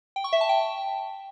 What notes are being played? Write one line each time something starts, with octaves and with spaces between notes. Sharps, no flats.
G5
C#6
E5
A5
G5